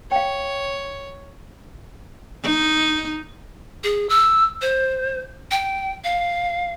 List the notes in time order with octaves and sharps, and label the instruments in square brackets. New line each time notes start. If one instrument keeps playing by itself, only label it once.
[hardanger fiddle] C#5 [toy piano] F5 G5
[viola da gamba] D#4
[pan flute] G#4
E6
C5
G5
F5